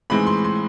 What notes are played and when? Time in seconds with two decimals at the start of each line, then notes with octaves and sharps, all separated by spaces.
0.10 A2 E3 G#3 C4 D#4 B5
0.27 C6
0.44 C6